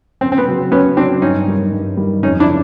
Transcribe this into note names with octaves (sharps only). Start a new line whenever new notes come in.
F#2 C4
C4
B3
C#3 F#3
F#2 B3 C#4
C#3 F#3 C4 D4
G2 C#4 D#4
D#3 G3
G2
D#3 G3
F2 C#4 D#4
D4 E4
C#3